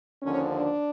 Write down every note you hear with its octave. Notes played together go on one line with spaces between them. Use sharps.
D#2 D3 F3 C#4
D4